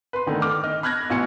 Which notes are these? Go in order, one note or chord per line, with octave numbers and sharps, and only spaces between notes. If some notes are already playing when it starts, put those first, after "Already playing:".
B4 C6
D3 D#3 A3
D6 F6
D#5 F6
B5 F6 F#6 G#6 A#6
A1 B2 G#5 C#7